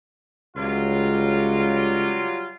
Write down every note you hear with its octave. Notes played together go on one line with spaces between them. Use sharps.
C#2 F#3 G3 F4